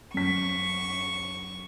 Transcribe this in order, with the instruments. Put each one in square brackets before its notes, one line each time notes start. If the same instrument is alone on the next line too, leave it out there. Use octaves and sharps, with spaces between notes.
[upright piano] F#2 B6 [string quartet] C#6